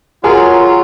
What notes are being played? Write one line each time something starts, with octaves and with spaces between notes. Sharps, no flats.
F#3 F4 G#4 A#4 C#5